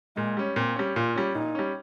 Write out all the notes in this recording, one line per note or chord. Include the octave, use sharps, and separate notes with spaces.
A#2 G#3
G3 C#4
A#2 C4
G3 C#4
A#2 F4
G3 C#4
A#2 D#4
G3 C#4